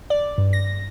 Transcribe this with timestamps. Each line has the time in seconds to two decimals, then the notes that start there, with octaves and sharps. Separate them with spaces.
0.10 D5
0.38 G2
0.53 A#6